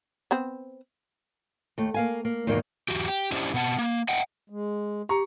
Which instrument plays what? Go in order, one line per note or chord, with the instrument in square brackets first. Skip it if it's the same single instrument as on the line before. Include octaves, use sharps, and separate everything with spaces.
[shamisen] B3 C4 C5
[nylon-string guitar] D#2 A3
A#3 F5 G#5
A#3
E2 G#2 B2 D#3 A3 A#3
[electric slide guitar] E2 F#4 G4
G4
C#4 D4 E4 G4 C5 D#5
B2 B3 F#5 A5
A#3
D#5 F#5 G5
[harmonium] G#3
[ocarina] G4 [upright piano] A#5 C#6 C#7